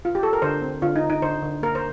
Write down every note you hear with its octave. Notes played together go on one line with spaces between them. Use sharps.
F4
G4
A4
A#4
D3 C5
C4
D3 F4
D#4
D3
D#4
D3 C5
D3
A#3 A#4
C5